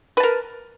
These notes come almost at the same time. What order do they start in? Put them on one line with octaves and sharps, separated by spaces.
B4 A5 A#4